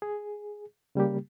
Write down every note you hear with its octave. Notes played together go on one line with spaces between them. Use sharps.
G#4
C#3 G3 A#3 G4